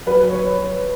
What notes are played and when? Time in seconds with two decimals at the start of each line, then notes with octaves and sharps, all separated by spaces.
0.06 F#3 B4
0.30 C#5